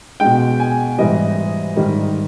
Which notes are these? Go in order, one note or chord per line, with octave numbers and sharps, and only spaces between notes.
B2 G#3 G5
G#5
G#2 E3 G3 D#5
G#2 D#3 G3